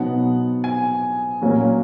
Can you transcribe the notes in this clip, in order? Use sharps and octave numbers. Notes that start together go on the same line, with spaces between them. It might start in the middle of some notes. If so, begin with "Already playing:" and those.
Already playing: B2 F#3 B3 D#4 F#5
G#5
A#2 F#3 A#3 C#4